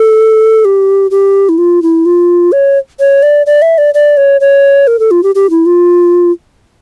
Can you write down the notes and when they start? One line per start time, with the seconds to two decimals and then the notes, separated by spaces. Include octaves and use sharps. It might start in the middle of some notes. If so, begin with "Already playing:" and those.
Already playing: A4
0.65 G4
1.11 G4
1.49 E4
1.58 F4
1.82 E4
2.05 F4
2.52 C#5
3.00 C#5
3.22 D5
3.46 D5
3.62 E5
3.78 D5
3.94 D5
4.17 C#5
4.41 C#5
4.87 A#4
4.99 A4
5.11 F4
5.23 G4
5.35 G4
5.50 E4
5.66 F4